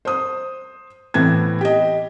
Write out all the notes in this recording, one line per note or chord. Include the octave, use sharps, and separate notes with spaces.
C5 D#6
A2 E3 B3 C4 G#6
G4 D#5